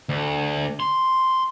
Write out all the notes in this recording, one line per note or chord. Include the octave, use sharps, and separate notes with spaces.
D2
C6